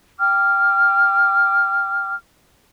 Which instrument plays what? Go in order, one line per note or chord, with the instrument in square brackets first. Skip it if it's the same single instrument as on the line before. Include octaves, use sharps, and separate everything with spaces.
[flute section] G5 D6 F6